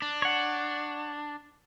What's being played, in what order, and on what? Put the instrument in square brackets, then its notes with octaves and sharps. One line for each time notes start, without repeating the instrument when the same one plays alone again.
[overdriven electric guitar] D4
[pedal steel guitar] C#5 F#5